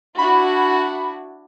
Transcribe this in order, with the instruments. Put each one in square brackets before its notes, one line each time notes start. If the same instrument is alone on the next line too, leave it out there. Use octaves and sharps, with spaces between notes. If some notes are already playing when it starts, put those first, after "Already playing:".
[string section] D4 E4 F#4 [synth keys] B5